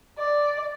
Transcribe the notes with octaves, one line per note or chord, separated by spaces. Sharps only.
D5